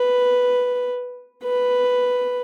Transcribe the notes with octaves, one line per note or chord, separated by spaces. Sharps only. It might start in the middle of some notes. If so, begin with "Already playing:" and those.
Already playing: B4
B4